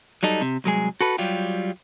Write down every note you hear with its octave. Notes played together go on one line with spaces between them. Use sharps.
F#3 G3 D#4 A4
C3
C2 F#3 G#3 G#4
F#4 A4 B4
F#3 G3 F4 G4